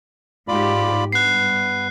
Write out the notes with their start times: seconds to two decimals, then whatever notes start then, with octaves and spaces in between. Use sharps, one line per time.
0.48 G#2 F4 G4 D5 B5
1.12 G2 B3 F#6 C7